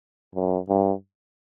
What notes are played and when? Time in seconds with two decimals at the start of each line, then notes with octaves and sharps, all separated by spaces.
0.35 F#2
0.69 G2